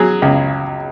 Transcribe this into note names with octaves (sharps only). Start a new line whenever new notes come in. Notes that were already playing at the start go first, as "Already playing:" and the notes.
Already playing: F#3 G#4
C#2